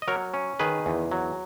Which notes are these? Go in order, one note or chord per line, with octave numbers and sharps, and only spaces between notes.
D#5
F#3 A#4 C#5
C#4
D#3 G#4 B4
E2
F#3